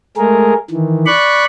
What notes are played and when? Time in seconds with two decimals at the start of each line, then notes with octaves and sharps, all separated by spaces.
0.17 G#3 A3 G#4 A#4
0.71 D#3 E3
1.06 D5 B5 C#6 F#6